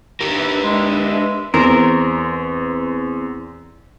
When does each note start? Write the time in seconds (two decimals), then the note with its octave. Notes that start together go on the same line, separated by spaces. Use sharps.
0.21 D4 G4 A#4 B4 E5
0.63 G#3
1.54 E2 C4 A#4